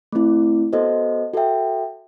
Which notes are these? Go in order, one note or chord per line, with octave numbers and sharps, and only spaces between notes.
A3 C4 E4
B3 F#4 A4 C5 D#5
F#4 A4 E5 G5